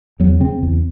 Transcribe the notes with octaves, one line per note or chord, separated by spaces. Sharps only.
E2 F#3
C#3 C4
E2